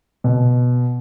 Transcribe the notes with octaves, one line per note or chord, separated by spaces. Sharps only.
B2